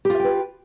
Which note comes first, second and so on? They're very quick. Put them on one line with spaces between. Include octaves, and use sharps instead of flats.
G4 F4 E5 G5 B4